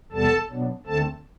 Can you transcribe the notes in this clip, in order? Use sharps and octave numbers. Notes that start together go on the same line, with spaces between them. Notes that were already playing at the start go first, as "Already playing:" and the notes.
E2 C3 G3 B3 A4 A5
B2 F#3 B3 D4
D2 D3 A3 C4 A4 A5